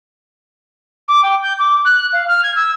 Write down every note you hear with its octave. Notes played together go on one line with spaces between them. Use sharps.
D6
G5
G6
D6
F#6
F5
F6
G#6
E6